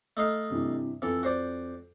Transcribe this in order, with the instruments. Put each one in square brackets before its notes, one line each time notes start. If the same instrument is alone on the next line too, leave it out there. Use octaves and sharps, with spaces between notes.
[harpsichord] A3 D#4 F5
[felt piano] G2 C3 E3
[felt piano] F2 [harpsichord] E3 A4
[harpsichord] F#4 C5 D5